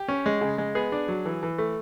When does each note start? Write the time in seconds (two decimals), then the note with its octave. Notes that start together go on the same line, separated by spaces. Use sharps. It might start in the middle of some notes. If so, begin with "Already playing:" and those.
Already playing: G4
0.08 C#4
0.26 G#3
0.41 C#3
0.58 G#3
0.75 B3 G#4
0.92 D4
1.08 F#3
1.25 E3
1.43 E3
1.58 A3